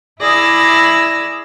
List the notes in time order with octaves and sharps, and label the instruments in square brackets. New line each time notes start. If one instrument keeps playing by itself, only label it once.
[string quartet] E4 G#4 D5 E6 A#6